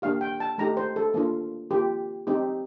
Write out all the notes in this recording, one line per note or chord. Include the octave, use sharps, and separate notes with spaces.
A#3 D4 G4 F5
G5
A5
A3 D#4 G4 A#5
C5
A4
A#3 D4 F4
A#3 F4 G4
C4 D#4 G4